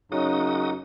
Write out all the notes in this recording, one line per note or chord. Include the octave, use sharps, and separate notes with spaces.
F#2 C#3 D#4 F#4 D#6